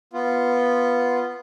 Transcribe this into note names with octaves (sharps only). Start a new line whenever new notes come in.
B3 F4